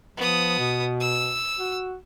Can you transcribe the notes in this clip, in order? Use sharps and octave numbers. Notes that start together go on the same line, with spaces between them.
F3 B3 D#6
B2
E6
F#4